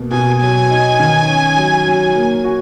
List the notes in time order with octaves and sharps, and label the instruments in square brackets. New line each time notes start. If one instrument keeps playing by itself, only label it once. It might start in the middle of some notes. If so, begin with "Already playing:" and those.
Already playing: [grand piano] B2 A#3
[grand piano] B2 [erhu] G#5
[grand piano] F#3 [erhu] G#5
[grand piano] D#4
D#3
C#4
F#3
F#3
A#3
F#4